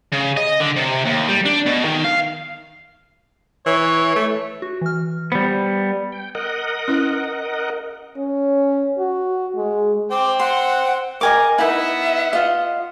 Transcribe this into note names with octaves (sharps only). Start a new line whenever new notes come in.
C#3
D#5
D3
C3
D#2
G3
D4
B2
D#3
F5
E3 C#5
A3
F#4
E3 F6
G3 B3 C5
G5
A#4 D#5 F#5
C#4 E4 B4
C#4
F#4
G#3
C5 G5 D6
F#5 C6
A#4 D#5 G#5 D6
B3 D#4 E4 E5 F#5
F4 D#5